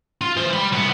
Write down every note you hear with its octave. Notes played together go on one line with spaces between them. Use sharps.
F4
E3 C5
G3 B5
C2 B3